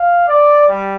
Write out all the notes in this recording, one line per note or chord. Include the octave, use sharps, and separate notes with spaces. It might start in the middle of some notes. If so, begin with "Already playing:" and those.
Already playing: F5
D5
G3